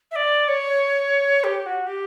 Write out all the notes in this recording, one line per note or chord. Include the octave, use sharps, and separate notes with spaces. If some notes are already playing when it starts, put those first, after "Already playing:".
E5
D5
C#5
G4
F#4
G4